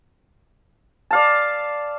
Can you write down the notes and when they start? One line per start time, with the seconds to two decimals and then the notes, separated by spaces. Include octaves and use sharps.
1.11 D5 F5 A5